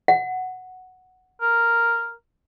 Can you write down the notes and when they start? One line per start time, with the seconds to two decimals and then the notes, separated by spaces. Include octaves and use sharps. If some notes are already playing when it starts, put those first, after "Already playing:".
0.08 F#5
1.41 A#4